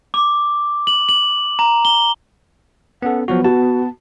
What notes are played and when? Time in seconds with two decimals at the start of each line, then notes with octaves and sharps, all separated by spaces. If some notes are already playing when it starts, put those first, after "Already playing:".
0.14 D6
0.87 F#7
1.09 F#7
1.59 A#5
1.85 G7
3.02 B3 C#4 A4 F#5
3.28 F3 F#3 B3 F#4
3.44 F#4 A5